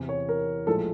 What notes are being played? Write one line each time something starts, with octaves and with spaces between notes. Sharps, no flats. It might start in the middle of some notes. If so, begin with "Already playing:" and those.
Already playing: E2 C3 E3
C#5
A#4
A#1 A2 F3 G#3 A4